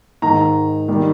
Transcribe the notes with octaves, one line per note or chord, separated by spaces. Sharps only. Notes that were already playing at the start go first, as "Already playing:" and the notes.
G#2 D#3 G#3 A#5
D#3 G3